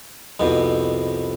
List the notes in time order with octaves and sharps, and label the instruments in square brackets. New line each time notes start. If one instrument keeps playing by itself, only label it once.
[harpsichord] C2 F2 B2